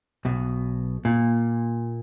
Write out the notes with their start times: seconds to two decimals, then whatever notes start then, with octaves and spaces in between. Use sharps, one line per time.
0.25 B1 B2
1.05 A#2